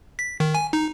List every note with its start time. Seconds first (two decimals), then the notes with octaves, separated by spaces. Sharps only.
0.19 B6
0.40 D#3
0.55 G#5
0.73 D#4